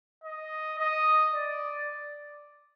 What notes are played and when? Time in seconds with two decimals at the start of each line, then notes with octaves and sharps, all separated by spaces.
0.24 D#5
0.79 D#5
1.33 D5